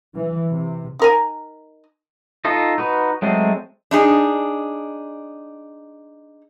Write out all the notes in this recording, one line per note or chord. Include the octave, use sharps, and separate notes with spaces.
E3
C3
D#4 A#4 G#5
D#4 F4 A4 D#5
D#4 F#4 B4
F#3 G#3 A3 C4 G#4
D4 D#4 G#4